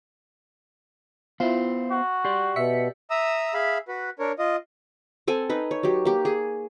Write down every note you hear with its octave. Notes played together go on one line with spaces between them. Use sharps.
B3 E4 F4 C5
F#4
G4 D5 C6
B2 E5 B6 C#7
E5 A#5 D#6 E6
G#4 E5 F5 B5
F#4 B4
D4 A#4 C#5
F4 D#5
C4 A4 G#5
D#4 B4
C#5
F#3 G4
A#3 G4
G#4